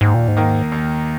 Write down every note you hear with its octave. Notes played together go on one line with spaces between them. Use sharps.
D#2 G#2
A#2
G#2
D#3 A#3
D#2